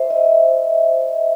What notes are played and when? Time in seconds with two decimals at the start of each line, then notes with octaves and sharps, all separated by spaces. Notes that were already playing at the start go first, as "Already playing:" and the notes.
Already playing: C5 E5
0.10 D#5